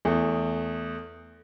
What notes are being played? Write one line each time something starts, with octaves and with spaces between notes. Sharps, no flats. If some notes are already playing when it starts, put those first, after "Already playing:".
E2 A3